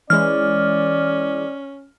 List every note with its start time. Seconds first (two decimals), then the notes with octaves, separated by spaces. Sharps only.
0.10 E3 G#3 C#4 D5 F6